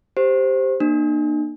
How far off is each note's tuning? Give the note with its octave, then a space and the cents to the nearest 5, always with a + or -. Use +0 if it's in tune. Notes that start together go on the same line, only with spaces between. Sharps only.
G4 +0 C5 +0
A#3 +10 D4 +40